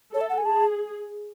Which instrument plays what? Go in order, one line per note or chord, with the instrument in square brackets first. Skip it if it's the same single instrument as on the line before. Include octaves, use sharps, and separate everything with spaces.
[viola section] A4 [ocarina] C#5
[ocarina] E5
F#5
G#5
[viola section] G#4 [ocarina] A5